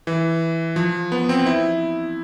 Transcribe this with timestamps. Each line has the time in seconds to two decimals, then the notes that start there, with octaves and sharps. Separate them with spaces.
0.07 E3
0.76 F3
1.12 B3
1.29 C4
1.46 E4